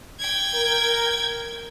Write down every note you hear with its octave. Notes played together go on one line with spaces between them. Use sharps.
G5 G#6
A#4